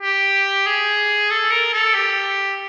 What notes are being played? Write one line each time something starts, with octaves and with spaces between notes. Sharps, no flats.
G4
G#4
A4
A#4
A4
G4